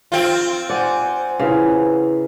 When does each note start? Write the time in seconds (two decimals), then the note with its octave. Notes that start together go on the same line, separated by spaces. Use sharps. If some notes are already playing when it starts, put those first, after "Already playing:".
0.12 C4 F4
0.70 C5 D5 F#5 G#5
1.40 C#3 E4 B4